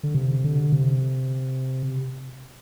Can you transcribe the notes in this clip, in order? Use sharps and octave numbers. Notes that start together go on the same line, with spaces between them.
D3
C3
D3
C3